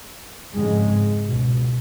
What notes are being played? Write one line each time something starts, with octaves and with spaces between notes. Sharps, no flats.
F2 G#2 C#3 G#3
C#2 B2